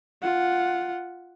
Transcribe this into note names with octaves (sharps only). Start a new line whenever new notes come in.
F4 F#5